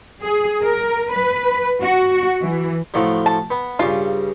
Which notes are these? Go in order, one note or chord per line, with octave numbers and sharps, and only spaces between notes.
G#4
A#4
B4
F#4
E3
A2 F3 F#3
A5
B3
G2 C#3 F4